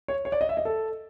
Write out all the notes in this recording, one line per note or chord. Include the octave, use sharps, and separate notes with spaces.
C#5
C#5
D5
D#5
E5
D#5
A4